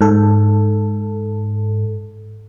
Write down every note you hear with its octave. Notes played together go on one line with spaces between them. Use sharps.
G#2 A4